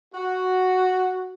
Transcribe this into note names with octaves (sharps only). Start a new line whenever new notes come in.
F#4